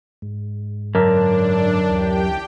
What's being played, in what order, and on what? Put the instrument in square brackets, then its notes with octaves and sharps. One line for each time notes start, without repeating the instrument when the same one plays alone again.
[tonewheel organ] G#2
[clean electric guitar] F#2 D3 [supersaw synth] D4 [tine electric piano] A#4
[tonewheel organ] D2 E3 [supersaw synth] G4 G5